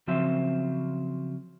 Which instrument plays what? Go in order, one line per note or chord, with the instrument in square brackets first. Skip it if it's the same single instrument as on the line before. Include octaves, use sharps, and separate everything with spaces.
[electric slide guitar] C#3 F3 F#3 C4 F4 E5